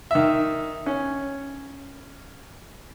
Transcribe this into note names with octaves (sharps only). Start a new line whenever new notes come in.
D#3 E5
C#4